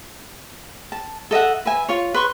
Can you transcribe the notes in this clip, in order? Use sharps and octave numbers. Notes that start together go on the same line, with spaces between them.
A5
A4 D#5 E5 F#5
B4 E5 G#5
F4 C#5
B4 C6 C#6